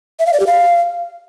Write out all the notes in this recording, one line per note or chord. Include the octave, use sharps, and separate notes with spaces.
E5
F5
D5
G4
F5